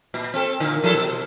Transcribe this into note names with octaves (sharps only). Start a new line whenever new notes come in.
A#2
C4 A4
A#2 D3
F3 E4 A4
B2